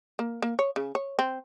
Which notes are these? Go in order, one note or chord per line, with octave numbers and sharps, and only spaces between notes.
A#3
A#3
C#5
C#3
C#5
C4